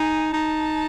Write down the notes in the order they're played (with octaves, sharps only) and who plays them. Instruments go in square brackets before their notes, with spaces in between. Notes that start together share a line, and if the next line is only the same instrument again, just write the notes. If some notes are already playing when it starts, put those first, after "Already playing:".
Already playing: [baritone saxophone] D#4 [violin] G#5
[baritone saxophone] D#4 [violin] A5